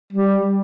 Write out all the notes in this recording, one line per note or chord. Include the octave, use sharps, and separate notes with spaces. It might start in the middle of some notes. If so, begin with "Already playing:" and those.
G3